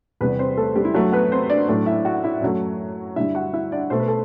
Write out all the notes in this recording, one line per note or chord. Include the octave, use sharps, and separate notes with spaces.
E2 C3 G3 B3 B4
C4 C5
A3 A4
G3 G4
E4
G2 F#3 A3 F#4
B3 B4
C4 C5
D4 D5
A2 F#3 A3 D4 D5
E4 E5
F#4 F#5
E4 E5
F#2 F#3 A3
G2 D3 G3 E4 E5
F#4 F#5
E4 E5
D4 D5
B2 A3 C5
B4
A4